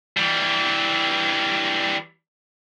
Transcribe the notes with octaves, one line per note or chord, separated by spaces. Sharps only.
E3 G3